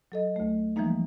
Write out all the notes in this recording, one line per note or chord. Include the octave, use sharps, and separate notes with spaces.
F#3 A4 D#5
D2 A3
E3 F3 G3 G#3 A#3 D#4